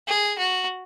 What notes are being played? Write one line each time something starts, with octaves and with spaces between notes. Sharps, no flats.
G#4
F#4